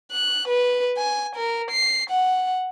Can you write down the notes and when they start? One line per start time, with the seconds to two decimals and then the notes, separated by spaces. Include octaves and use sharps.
0.12 F#6
0.48 B4
0.98 G#5
1.36 A#4
1.71 C7
2.10 F#5